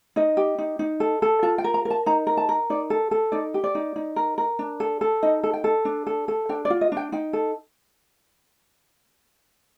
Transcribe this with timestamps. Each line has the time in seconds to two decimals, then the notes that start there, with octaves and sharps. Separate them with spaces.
0.16 D#4 D#5
0.37 G4
0.58 D#4
0.79 D#4
1.00 A4
1.22 A4
1.43 F4 A5
1.58 G5
1.64 A#4
1.74 A#5
1.85 A#4
1.90 A5
2.06 D#4 A#5
2.27 A#4
2.37 A5
2.49 A#4
2.70 D#4 D5
2.90 A4
3.11 A4
3.32 D#4 D5
3.54 G4
3.64 D5
3.75 D#4
3.96 D#4
4.16 A#4
4.38 A#4
4.59 D4
4.80 A4
5.01 A4
5.22 D#4 D#5
5.43 A4
5.53 G5
5.64 A4
5.85 D4
6.07 A4
6.28 A4
6.49 D4 G5
6.65 D5
6.70 F4
6.81 D#5
6.92 D4 G5
7.12 D#4 G5
7.33 A4